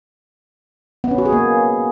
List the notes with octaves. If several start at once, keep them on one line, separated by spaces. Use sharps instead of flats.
B3
C#4
F#4
G#4
A#3